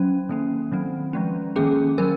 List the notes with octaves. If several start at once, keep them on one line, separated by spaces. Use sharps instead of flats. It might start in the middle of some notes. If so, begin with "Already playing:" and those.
Already playing: F#3 C#4
D#3 A#3 C#4
D#3 F#3 C4
F3 G#3 C#4
D#3 A#3 C#4 G#4
D#3 F#3 C#4 A#4